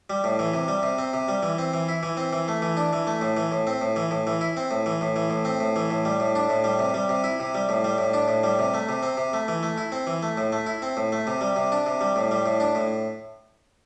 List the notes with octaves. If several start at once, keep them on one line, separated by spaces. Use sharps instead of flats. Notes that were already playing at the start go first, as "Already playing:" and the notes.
G3
A2
E3
C3
G3
C3
C4
C3
G3
E3
C4
E3
E4
E3
C4
E3
A3
E3
D4
E3
A3
A2
E3
A2
C4
A2
E3
A2
E3
E4
C4
A2
E3
A2
E3
A2
C4
A2
E3
A2
G3
A2
D4
A2
G3
C3
G3
C3
E4
C3
G3
A2
G3
A2
D4
A2
G3
C3
A3
C3
C4
C3
A3
E3
A3
E4
C4
E3
A3
A2
A3
E4
C4
A2
A3
C3
G3
C3
D4
C3
G3
A2
G3
A2
D4
A2